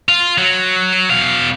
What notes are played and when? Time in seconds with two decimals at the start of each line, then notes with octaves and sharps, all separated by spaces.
0.09 F4
0.38 F#3
1.10 B2 F5